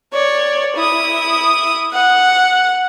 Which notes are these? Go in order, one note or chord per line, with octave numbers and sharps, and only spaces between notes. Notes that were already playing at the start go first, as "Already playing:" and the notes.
C#5 D5
E4 D#6
F#5